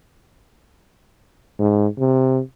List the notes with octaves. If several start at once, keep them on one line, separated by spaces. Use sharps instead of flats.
G#2
C3